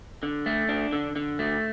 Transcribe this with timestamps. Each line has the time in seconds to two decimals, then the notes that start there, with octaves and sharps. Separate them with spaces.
0.23 D3
0.46 A3
0.69 D4
0.93 D3
1.16 D3
1.39 A3